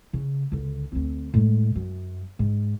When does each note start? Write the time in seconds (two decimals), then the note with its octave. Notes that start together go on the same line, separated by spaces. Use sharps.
0.13 C#3
0.52 C#2 D3
0.92 D2 C4
1.34 A2 G#3
1.76 F#2
2.39 G#2